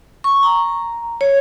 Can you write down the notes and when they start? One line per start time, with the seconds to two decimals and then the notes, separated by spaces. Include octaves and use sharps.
0.24 C#6
0.43 A#5
1.21 C#5